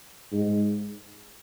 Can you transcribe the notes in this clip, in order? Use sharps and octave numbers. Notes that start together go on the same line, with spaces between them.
G#2